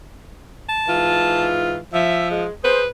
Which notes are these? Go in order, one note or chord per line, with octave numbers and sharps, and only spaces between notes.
A5
G#2 E3 F4
F3 E5
G#3
G#4 B4 C5